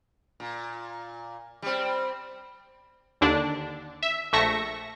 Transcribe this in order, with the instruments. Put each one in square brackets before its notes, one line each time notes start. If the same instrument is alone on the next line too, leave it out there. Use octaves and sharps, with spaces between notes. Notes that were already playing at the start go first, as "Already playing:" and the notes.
[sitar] A#2
G3 C4
[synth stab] D#2 D3 D4
E5
A#1 A3 E5 C#6 A#6